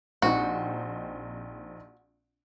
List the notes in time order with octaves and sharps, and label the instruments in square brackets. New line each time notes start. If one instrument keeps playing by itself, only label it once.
[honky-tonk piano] A#1 C4 D#4 [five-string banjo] F#4